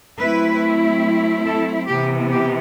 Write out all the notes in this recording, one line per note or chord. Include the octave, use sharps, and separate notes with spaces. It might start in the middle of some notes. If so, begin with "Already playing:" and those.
F#3 A3 C4 E4 B4
A4
C3 E3 B3 G4
G4